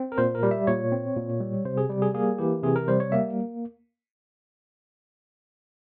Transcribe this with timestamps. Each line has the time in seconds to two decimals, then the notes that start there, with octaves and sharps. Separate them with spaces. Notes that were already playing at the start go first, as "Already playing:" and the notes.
Already playing: C4
0.12 A#4
0.18 A#2 C5
0.35 A#4
0.43 G3
0.51 E5
0.67 A#2 C#5
0.92 C4
1.16 A#2
1.41 G3
1.65 C3 C5
1.77 G#4
1.90 G3
2.02 G#4
2.14 A#3 G#4
2.38 E3 G4
2.63 C3 G#4
2.76 A#4
2.88 G3 C5
3.00 C#5
3.12 A#3 E5